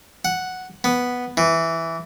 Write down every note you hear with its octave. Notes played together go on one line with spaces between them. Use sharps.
F#5
B3
E3